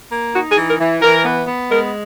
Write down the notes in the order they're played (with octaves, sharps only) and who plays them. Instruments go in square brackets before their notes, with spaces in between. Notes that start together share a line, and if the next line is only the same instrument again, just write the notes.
[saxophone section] A#3
D#4 F#4
G#4
E3
A#4
E3
E3 A#4
B3
B3
G#3 A#4